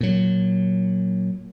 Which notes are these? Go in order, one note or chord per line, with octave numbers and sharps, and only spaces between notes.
A#2 F#3